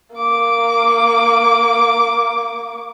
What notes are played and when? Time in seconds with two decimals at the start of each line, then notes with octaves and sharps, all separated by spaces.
0.16 A#3 D6